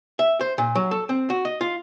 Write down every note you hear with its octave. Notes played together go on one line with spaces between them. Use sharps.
E5
C5
A#2
F#3
A4
C4
F#4
D#5
F4